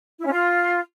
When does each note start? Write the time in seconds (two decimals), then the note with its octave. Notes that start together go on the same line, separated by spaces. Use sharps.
0.20 E4
0.26 C#4
0.32 F4